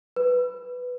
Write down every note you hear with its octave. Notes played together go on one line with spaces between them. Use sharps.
B4